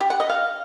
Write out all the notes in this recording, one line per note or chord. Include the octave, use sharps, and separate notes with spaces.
G4
F#5
D#5
F5